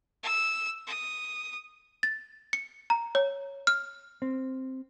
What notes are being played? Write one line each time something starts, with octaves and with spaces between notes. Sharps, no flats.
E6
D#6
A6
C#7
A#5
C#5
F6
C4